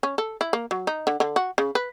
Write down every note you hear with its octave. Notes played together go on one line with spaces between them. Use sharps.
C#4
A4
E4
A#3
F#3
D#4
D3
D3
F#4
C#3
B4